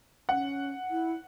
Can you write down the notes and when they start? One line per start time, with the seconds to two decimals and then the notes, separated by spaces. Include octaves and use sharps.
0.29 C#4 F#5
0.90 E4